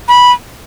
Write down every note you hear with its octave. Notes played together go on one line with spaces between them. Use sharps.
B5